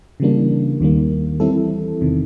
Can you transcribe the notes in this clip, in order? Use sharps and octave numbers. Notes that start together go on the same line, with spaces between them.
C#3 E3 G3 A#3 D4
D#2 D#3 G3 A#3
E3 G3 C4 E4 A4
E2 C3 D#3